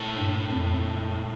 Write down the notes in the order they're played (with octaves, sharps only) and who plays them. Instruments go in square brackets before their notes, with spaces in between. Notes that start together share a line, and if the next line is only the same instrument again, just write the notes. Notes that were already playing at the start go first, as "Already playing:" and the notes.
Already playing: [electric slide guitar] A#2 A3 E4 A4
[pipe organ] G2
F2